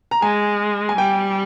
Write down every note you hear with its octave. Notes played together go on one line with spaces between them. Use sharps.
A#5
G#3 G#5
G#5
G3 G5